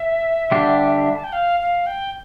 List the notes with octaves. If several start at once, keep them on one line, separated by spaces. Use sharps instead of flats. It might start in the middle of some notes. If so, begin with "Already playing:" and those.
Already playing: E5
D3 G3 D4 G4
A5
G5
F5
F5
G5